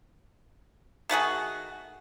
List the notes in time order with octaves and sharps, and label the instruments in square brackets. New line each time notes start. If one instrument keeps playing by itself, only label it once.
[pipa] D#3 A3 F#4 G#4